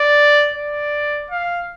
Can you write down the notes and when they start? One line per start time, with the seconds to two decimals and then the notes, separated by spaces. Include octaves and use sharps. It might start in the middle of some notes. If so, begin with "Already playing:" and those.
Already playing: D5
0.56 D5
1.31 F5